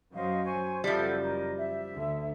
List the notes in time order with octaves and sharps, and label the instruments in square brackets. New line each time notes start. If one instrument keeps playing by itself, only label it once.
[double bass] F#2 F#3 [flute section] C5 D#5 F5
[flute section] C5 G#5 C#6
[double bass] F#1 [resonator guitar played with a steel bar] F3 G3 [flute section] A4 E5 F#5
[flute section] A#4 D#5
E5
[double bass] D2 D3